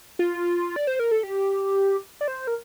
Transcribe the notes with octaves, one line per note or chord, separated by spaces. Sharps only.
F4
D5
C5
A#4
A4
G4
D5
C5
A#4